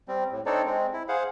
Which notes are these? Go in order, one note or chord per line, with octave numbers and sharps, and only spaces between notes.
G3 C4
A2
C4 D4 D#4 A4 C#5 D5
G#3 C4
E4
G#4 C5 F5 F#5